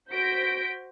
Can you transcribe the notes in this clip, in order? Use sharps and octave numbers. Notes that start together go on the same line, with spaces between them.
F#4 C5 G6 A#6 B6 D7